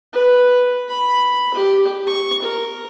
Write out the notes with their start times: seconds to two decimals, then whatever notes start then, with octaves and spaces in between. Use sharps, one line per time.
0.13 B4
0.89 B5
1.54 G4
2.07 C#6
2.42 A#4